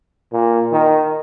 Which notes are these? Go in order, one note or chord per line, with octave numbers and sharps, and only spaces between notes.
A#2
D#3